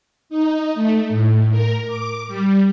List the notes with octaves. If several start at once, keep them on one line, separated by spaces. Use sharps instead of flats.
D#4
A3
A2
A#4
D6
G3